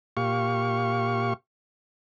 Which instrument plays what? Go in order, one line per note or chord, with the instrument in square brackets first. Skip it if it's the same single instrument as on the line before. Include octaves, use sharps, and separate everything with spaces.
[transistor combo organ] A#2 G4 F5 C#6